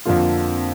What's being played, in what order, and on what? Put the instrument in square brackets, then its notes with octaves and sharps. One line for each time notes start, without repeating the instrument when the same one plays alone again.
[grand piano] F2 D3 F3 A#3 F4